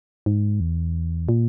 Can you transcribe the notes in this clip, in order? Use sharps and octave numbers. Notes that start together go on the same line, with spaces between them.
G#2
E2
A#2